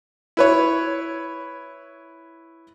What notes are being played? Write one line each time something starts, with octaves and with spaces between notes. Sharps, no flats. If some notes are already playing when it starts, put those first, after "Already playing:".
E4 B4 C#5